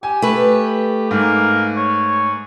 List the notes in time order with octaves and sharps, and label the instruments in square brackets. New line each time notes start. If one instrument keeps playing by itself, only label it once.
[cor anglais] G4 [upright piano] G#5
[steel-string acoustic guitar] A3 B4
[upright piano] G#2 [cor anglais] A#3
[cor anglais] C#5